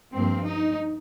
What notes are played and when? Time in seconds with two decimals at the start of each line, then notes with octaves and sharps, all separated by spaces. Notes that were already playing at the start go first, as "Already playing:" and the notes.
0.14 G2 F3 A#3 C4
0.46 D#4